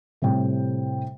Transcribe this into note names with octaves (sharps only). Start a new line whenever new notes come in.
A2 C3 G3 G5